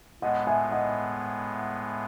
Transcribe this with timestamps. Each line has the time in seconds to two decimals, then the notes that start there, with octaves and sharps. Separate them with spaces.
0.22 A2 G#3 B3 D#5 F#5
0.47 E5 G#5
0.72 D#5 F#5